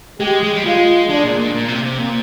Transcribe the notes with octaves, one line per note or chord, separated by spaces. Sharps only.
G#3 G4
G#3
G3
G#3 F4
G#3 D4
A#2
A#2
A#2
C3
C3
A#2